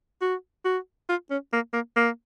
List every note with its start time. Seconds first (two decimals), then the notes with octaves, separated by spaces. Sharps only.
0.21 F#4
0.65 F#4
1.09 F4
1.31 C#4
1.53 A#3
1.73 A#3
1.96 A#3